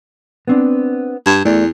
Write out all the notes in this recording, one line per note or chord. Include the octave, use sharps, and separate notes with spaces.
B3 C4 D4
G2
E2 A3 D5